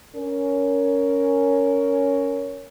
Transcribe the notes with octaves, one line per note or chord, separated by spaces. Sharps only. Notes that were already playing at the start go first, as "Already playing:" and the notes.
C#4 A#4